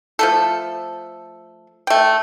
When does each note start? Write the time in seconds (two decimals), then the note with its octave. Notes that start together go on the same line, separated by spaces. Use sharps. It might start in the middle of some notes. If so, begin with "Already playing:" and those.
0.19 F3 A3 A4
1.87 A3 G5